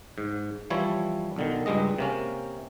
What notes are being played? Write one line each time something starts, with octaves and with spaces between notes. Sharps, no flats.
G#2
E3 F3 G3 E4 C#5
B1 D3 D#3
C#2 G2 G3 G#3 D#5
C3 A#3 C#4